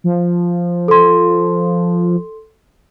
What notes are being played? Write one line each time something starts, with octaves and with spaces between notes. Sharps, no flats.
F3
A4 C6